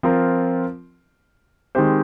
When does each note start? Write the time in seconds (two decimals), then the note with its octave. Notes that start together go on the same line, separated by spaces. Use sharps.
0.03 F3 C4 F4 A#4
1.75 D#3 G#3 C4 G4 C5